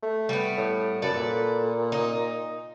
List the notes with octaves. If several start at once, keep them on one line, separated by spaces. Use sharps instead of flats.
A3
G3 B3
A2
F#2 A4 B4 D5
A#2
D#4